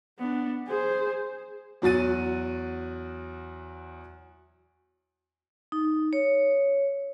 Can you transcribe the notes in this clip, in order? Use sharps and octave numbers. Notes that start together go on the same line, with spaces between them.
B3 D4
G#4 C5
E2 F#3 F#4 A6 D#7
D#4
C#5